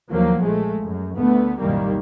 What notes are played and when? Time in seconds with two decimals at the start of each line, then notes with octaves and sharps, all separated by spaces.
0.11 D#2 F3 F#3 A#3
0.41 A#1 G#3 A3
0.82 F#2
1.18 D2 A3 B3
1.59 C2 F#2 A#2 D#3 G3 A#3